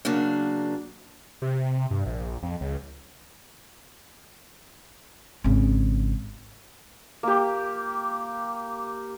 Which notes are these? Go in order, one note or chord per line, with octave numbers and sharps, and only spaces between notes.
C#3 F#3 A#3 D4
C3
G2
A#1
F2
C#2
G#1 C#3
A#3 G4